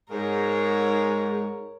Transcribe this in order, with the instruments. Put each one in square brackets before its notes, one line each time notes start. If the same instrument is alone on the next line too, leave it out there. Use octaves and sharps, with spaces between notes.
[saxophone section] G#2 [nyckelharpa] A#4 C#5